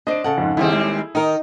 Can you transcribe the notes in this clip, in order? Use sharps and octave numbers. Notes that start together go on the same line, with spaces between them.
D4 C5 D#5 D7
C#3 A4 F#5
F2 G#2
D#2 G3 C4 E4 G#4
G#3
D#3 D#4 A#4